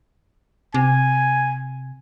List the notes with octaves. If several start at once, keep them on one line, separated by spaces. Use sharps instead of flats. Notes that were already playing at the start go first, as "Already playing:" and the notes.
C3 G#5